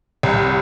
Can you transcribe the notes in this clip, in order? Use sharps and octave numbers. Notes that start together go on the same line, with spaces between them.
C2